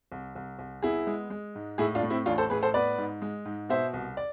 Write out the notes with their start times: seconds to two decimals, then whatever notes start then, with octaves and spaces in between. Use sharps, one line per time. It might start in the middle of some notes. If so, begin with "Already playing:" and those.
0.12 C2
0.35 C2
0.59 C2
0.82 B3 E4 G#4
1.07 G#3
1.30 G#3
1.55 G#2
1.78 A2 E4 G#4
1.95 D4 F4
2.03 A2
2.10 C4 E4
2.26 A1 D4 F4
2.38 A4 C5
2.50 A2 G#4 B4
2.63 A4 C5
2.74 B3 B4 D5
2.98 G#2
3.22 G#3
3.45 G#2
3.69 B2 C5 E5
3.94 C2
4.17 D5